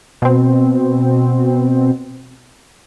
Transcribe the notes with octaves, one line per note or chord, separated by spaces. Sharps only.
B2 C4